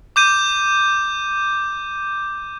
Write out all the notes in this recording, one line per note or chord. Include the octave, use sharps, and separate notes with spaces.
D6 G6 D#7